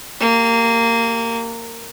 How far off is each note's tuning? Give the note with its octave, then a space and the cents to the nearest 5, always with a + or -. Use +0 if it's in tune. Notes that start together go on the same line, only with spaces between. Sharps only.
A#3 -20 G4 +0